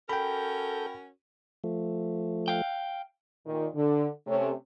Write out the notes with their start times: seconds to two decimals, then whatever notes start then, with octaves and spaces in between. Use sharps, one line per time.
0.09 C#4 F#4 A4 A#4 G5 B5 G6
1.64 F3 A3
2.48 F5 G5
3.47 A#2 D#3
3.75 D3
4.27 C3 A3 C#4